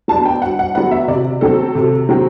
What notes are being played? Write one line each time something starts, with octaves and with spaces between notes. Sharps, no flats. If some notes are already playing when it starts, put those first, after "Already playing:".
F#3 B3 D4 A5
G5
G2 F#5
F#5
F#3 B3 D4 F#5
E5
C3 D5
F#3 C4 A4
C3
F#3 C4